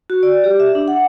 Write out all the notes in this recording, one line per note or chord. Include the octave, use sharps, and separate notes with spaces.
F#4
D5
G4
E5
D4
F#5